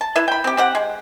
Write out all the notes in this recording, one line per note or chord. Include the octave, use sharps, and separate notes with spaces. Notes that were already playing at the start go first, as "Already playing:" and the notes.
A5
E4 B4 E5
G5 B5
C4 G4
C4 G4 F#5
G#3